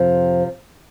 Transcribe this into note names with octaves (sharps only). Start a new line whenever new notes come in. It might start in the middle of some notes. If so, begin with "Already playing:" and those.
Already playing: F2 C3 F3